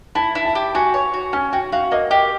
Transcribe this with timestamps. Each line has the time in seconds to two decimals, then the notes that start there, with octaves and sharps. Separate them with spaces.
0.15 E4 A5
0.35 E4
0.45 A5
0.55 G4
0.75 F#4 G#5
0.94 C#5
1.14 F#4
1.33 C#4 G#5
1.53 F#4 G5
1.72 F#4 F5
1.91 A#3 D#5
2.11 G4 D#5